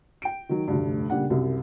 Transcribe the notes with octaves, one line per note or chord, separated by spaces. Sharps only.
G5 D7
D#3 F#3
F1 D2 G2
A#2 C#3 G3 D4 F#5
C2 F#2 C3